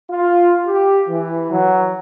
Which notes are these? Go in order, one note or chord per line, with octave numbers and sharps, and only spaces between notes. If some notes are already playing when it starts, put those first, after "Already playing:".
F4
G4
E3
F#3